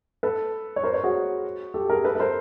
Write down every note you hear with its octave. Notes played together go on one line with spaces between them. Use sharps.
A4 B4
C#5
A#4 C5
B4 C#5
F#4 G#4
G4 A4
G#4 A#4
A4 B4
B4
A#4 C5